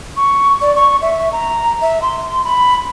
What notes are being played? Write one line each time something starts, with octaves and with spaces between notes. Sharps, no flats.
C#6
D5
C#6
E5
A#5
E5
C6
B5